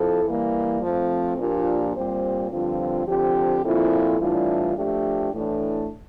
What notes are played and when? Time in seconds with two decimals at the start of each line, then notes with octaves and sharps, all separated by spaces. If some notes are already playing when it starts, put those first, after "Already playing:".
Already playing: F3 C4 E4 A4
0.25 E3 G3 A#3
0.82 F3 A3 C4
1.38 A#2 F3 A#3 D4 G4
1.94 A#2 G3 C4 G4 C5
2.51 G2 D3 F3 C4 F4
3.06 D3 F3 C4 G4
3.63 A#2 F3 C4 E4 A4
4.19 A2 E3 G3 D4 F4
4.76 F3 A3 D4 G4
5.32 A2 E3 A3 D4